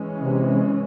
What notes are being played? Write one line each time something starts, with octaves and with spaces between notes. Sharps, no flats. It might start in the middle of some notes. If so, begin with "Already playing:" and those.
Already playing: E3 G#3 C#4
C3